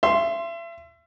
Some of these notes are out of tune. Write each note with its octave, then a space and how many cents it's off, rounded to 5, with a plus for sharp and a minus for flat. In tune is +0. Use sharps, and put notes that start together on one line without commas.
E5 +35 C6 +0